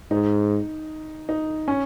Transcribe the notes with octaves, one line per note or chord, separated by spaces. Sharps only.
G#2 D#4
D#4
C#4